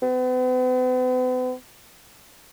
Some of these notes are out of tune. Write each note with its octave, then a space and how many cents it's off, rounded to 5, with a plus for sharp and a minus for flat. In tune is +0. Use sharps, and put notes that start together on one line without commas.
B3 +45